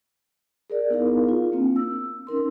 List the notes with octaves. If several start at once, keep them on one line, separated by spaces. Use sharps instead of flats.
G#4 A#4 D5
B3 D#4 E4 G#4 A#4 F5
F4
A#3 C4 D4
E6
C#4 D#4 A#4 C6